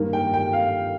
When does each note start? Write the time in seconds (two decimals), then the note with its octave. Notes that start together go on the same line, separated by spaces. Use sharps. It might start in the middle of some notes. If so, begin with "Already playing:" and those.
Already playing: G2 D#3 A#3
0.13 G5
0.34 G5
0.53 F5